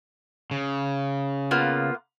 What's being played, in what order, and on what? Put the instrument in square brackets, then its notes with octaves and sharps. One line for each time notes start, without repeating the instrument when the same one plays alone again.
[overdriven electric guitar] C#3
[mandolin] A#3 B3 F4